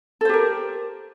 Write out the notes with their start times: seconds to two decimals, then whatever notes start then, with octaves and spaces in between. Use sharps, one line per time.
0.21 A4
0.25 C5
0.29 G4
0.34 A#4